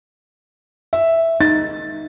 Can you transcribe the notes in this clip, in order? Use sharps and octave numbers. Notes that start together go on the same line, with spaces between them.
E5
D#4 A6